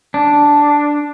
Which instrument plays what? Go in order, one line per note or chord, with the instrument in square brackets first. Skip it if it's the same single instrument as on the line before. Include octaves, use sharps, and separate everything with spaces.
[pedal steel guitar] D4